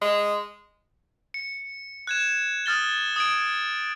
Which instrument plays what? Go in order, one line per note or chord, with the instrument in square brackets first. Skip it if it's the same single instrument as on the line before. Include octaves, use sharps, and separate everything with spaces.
[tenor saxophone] G#3
[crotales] C#7
F#6 G#6 E7
D#6 F6 A6 G7
D#6 G#6 D7